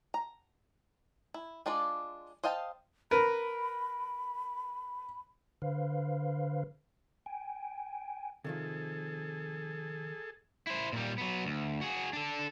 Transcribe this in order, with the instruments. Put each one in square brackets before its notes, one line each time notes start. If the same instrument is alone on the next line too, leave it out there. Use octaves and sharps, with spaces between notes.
[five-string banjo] A#5
E4
G#3 D4 F4 D5
C5 D#5 F5 G5 A5
[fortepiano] A#4 B4 [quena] B5
[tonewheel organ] D3 B4 C5 F5
G5 G#5
[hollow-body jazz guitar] C3 D#3 F3 [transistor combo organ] G#4 A4
[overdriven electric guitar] E4 C5
A#2 G3
F#3 B3
D2
F#4 G#4
D4 A4